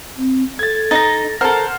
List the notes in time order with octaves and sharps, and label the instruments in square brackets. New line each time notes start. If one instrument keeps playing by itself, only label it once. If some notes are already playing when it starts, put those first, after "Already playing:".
[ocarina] C4
[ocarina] A4 [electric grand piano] G#6 A6
[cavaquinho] D#4 D#5 [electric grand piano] A6 A#6
[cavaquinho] A4 A#4 [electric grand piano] C5 F#5 F6